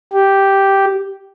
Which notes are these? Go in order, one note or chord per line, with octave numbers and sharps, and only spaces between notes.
G4